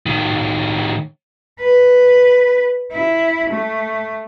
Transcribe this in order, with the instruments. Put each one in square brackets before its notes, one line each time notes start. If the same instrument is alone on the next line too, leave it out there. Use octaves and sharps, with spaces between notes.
[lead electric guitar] A2 D#3
[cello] B4
E4
A3